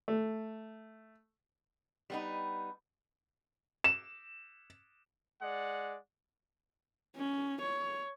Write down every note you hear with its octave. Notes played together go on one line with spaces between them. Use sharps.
A3
G3 B3 D#4
E7
G#3 D5 F#5
C#4
C#5